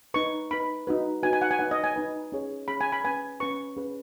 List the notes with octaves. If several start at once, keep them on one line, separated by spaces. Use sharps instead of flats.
D#4 B4 C#6
D#4 B4 B5
D#4 F#4 B4
D#4 F#4 B4 G#5
G#5
F#5
G#5
D#4 B4 F#5
D#5
G#5
D#4 B4
C#4 G#4 C#5
C#4 G#4 C#5 B5
G#5
B5
C#4 B4 G#5
C#4 B4 C#6
C#4 G#4 B4